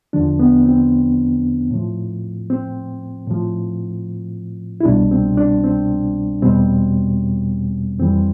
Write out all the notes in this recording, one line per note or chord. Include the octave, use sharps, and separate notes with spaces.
E2 D3 F3 D4
B3
C4
A2 F3
C4
A2 F3
E4
C2 B2 G3 D4
C4
D4
C4
E2 B2 G3 C4
F2 E3 G3 C4